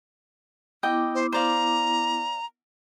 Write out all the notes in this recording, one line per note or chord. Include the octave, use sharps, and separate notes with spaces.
B3 E4 D#5 G5 D6
C5
C5 D5 F5 A#5